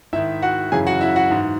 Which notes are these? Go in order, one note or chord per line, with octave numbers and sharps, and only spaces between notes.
G#2 D#3 E4 E5
F#4 F#5
F#2 C#3 E3 G#4 G#5
F#4 F#5
E4 E5
F#4 F#5
G#2 E3